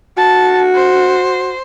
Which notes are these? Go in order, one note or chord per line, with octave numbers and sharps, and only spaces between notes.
F#4 A5
C5